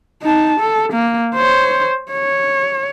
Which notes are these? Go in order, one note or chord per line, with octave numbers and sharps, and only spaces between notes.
D#4 A5
A4
A#3
C5 C#5
C#5